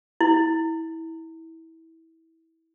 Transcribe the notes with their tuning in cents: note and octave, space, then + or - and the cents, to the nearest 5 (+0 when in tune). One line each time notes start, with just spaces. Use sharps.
E4 -20